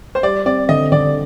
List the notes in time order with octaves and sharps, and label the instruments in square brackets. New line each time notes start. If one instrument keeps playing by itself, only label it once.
[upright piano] C5
[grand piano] G3 [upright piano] D5
[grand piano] C4 [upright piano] D5
[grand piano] D3 [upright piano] D#5
[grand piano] D3 [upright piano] D5